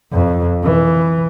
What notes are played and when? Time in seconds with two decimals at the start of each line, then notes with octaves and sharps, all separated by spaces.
0.12 F2
0.64 E3